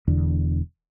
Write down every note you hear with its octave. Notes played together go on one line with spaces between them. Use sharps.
E1 E2 D3